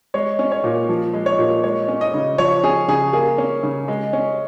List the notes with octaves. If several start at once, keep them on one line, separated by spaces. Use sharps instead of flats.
G#3 C#5
C#4
C#5
A#2
F3
G#3
C#5
A#2
G#3 C#5
C#4
D#5
C#3
F3 C#5
C#4 G#4
C#3 G#4
A#3 G#4
C#4
C#3
G#3
C#4